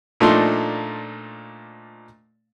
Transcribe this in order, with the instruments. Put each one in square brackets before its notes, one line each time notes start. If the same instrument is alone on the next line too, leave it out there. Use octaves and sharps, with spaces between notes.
[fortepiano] A#2 F3 A3 D4 D#4 C6